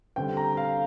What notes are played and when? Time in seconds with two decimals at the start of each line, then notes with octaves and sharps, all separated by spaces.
0.16 D3 G3 C4 G5
0.37 A#5
0.57 F5